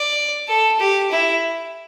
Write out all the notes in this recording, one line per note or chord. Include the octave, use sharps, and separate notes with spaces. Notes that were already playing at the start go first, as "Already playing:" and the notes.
Already playing: D5
A4
G4
E4